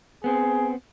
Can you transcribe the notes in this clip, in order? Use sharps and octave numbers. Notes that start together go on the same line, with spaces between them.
B3 C4 G#4